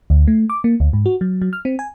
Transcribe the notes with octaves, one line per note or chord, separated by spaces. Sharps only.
D2
A3
D6
A#3
D2
G#2
F#4
F#3
F#3
F6
C4
G#5